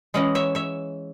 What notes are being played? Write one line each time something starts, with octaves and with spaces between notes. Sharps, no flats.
E3 G#3 C#4 D#5 F#5
C#5 E5
C#5 E5